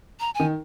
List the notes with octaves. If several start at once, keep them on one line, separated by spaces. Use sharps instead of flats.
A#5
D#3 G#5